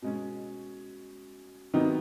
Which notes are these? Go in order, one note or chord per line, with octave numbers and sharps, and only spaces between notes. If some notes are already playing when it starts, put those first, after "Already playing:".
B2 G#3 C#4
C3 D#3 F#3 B3 D#4